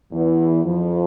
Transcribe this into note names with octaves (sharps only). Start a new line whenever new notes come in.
E2 E3
F2 F3